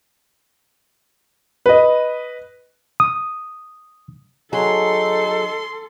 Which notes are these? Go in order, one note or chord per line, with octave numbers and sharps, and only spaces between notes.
B4 D#5
D#6
F#3 D#4 G#4 A4 C6